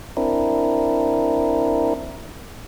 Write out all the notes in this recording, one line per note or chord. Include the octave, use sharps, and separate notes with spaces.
C4 D4 E4 A#4